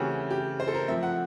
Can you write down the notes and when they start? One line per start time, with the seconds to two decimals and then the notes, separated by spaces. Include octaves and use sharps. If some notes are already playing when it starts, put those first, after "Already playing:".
Already playing: C#3 E3 A3 C4 C#4 F#4 G4
0.30 G4
0.60 C5
0.67 A4
0.74 A#4
0.88 F3 A3 C4 E5
1.03 F#5